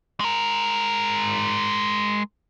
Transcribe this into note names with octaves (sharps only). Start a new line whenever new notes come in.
G#3 A#4